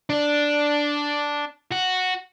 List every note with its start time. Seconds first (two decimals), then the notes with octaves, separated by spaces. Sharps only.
0.10 D4
1.71 F#4